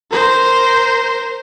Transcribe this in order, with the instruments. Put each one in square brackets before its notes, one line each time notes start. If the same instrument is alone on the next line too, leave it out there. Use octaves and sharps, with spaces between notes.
[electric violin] A#4 C5